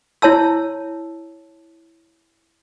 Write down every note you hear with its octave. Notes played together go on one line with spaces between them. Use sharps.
E4 C#5 A5 E6